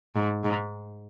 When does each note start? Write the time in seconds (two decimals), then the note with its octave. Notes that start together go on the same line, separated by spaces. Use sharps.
0.16 G#2
0.44 G#2